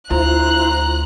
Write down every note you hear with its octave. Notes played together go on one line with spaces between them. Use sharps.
D2 E4 F4 C5 A#5 F#6